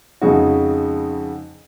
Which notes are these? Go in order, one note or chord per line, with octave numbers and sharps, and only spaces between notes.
F2 C#3 G#3 D#4 F#4